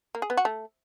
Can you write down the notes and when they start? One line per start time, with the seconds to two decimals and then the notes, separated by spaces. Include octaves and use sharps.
0.15 A#3
0.22 G#4
0.30 B3
0.37 F#4
0.45 A3